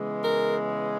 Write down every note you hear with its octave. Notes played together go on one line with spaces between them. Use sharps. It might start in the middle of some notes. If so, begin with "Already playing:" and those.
Already playing: C#3 E3 G#3 B3
A#4